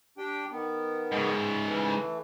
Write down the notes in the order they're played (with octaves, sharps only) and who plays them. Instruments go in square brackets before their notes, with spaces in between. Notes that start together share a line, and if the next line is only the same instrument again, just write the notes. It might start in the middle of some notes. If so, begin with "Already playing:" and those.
[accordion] D4 G4 G5
D#3 B3
[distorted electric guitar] G#2 C#3
[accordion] E3 A3